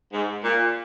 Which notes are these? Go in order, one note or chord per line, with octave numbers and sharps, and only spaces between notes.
G#2
A#2